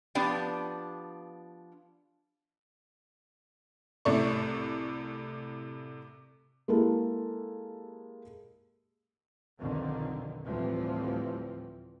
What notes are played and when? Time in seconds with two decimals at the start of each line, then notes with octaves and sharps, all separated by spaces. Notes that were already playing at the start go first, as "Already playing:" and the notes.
0.15 F3 B3 D4 G4
4.05 C2 A2 C3 A3 D5 C#6
6.68 G#3 A#3 E4 G4 A4 A#4
9.60 B1 F2 D3 D#3
10.45 D2 A2 E3 F3 G3 C4